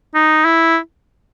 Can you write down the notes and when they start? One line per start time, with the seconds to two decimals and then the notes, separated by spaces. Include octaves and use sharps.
0.14 D#4
0.45 E4